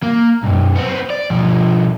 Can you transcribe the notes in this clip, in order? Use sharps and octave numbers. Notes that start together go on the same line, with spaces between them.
A#3
B1 F#2
B3 C4
D5
B2 F3